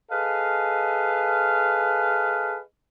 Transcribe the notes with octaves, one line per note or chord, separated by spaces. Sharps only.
G#4 A4 B4 D#5 F5